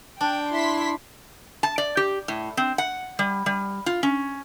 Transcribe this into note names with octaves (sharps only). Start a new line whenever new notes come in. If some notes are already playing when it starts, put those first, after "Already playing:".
D4 G5
E4 C6 B6
A5
D5
G4
A2
C4
F#5
G3
G3
F4
C#4